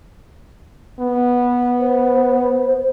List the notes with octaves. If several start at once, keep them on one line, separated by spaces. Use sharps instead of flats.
B3
C5